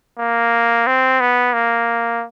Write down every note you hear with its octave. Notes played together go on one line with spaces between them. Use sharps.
A#3
C4
B3
A#3